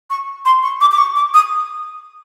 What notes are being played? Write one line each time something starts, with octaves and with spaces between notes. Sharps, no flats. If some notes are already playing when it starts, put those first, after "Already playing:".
C#6
C6
C#6
D6
D6
C#6
D6
D#6